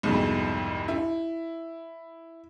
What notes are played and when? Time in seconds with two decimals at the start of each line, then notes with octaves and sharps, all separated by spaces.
0.03 C2 F2 G#2 B2
0.88 E4